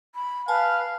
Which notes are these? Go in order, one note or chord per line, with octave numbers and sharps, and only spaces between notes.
B5
B4 F5 G#5 A5